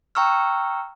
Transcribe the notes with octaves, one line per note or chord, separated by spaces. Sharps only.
G5 A#5 C#6 E6 F6